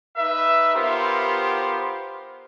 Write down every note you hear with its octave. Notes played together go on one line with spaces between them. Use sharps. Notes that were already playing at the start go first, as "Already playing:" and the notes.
D#4 B4 E5
B3 F4 G4 A#4 C5